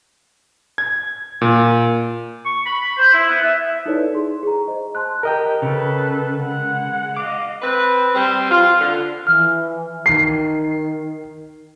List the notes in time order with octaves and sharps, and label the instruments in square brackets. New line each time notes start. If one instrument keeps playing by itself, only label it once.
[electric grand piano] G#6
A#2
[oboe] C#6
B5
C5
E4
B3
E5
[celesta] D#4 E4 A4 B4 C#5 D5
D#4 G#4 C6
G#4 A#5
C5 D#5
A5 C6 F#6
[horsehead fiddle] G4 [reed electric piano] A#4 D#5 G5
[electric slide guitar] C#3 [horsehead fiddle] A4 B4
[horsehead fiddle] G#3 F#5
[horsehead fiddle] D#5 F5 [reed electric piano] D6
[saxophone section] C4 B4
G3 C4
F4
D3
[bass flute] E3 [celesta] F6
[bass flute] D#3 [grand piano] C7